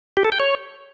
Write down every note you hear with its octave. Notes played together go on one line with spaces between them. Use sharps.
G4
A4
G5
C#5